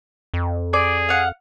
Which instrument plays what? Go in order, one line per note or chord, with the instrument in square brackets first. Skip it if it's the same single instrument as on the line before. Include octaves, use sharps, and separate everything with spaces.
[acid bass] F2
[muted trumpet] G#4 [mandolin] D5
[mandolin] F5 F#5